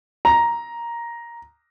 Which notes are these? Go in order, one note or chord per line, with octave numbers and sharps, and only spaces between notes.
A#5